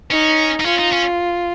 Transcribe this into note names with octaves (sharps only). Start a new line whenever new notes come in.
C#4 D#4
D#4
C#4 F4
D#4
C#4